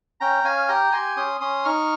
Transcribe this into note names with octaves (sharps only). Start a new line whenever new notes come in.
C#4 G5 A#5
C#4 F5 G#5
G4 G5 A#5
G4 G#5 C6
C#4 C6 D#6
C#4 C6 D#6
D#4 C#6 F6